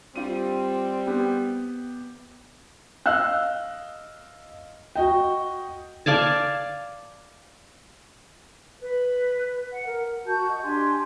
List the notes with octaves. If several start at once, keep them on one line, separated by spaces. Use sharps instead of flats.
G3 C4 F4 D#7
B3 G4
D#5 F5 E6 F#6
F#4 D#5 G5
D5 F5 G#5 A5
B4
F#5
A#4
F#4 A5 G6
D#5
D4 G4 G#5 C6